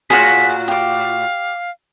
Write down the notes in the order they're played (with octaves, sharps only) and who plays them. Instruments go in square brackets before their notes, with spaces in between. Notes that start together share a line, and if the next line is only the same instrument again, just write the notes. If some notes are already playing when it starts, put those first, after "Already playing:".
[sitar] A2 F4 F#4 [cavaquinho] G#4 C#5 F#5 [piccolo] B6
[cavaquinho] G4 D6 [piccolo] F5